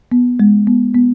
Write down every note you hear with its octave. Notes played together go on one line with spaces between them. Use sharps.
B3
G#3
B3
B3